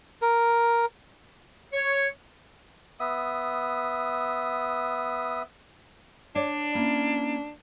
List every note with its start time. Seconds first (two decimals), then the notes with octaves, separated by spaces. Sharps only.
0.22 A#4
1.73 C#5
3.00 B3 E5 D#6
6.36 D4 C#5 D5
6.75 A#3 C#4 E4